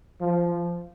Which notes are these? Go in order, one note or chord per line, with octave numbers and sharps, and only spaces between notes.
F3